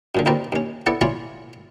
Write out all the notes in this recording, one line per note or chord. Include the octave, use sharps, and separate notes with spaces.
F#2 A#2 D3
D#2 A#2 C4 A#4 B4 D5
D#2 C#4
B3 E4 A4 D5 F#5
E4 F4 C#5 D5 G#5 B5